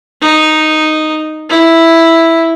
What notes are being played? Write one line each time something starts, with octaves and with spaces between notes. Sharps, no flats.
D#4
E4